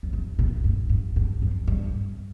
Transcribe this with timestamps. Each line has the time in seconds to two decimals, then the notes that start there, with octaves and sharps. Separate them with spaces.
0.03 F2
0.13 G2
0.39 A#2
0.64 G2
0.89 G2
1.16 G2
1.42 F2
1.68 G2